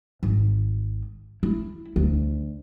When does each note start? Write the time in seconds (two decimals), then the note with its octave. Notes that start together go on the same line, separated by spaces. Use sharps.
0.23 G#1
1.43 E4
1.96 D2